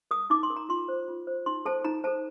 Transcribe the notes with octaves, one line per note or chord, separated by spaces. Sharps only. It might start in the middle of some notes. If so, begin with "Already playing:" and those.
A#4 D#6
D#4 D6
C6
A#4
A#5
F4 C6
C5
F4
C5
D#4 C6
A4 C5 A5
D#4 A#5
A4 C5 A5